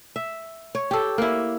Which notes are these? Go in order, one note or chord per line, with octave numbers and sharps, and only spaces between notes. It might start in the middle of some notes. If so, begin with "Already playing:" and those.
E5
C#5
G4 A4
A#3 E4